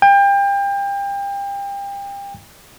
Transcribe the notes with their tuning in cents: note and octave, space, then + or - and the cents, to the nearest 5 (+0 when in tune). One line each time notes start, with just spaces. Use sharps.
G5 +30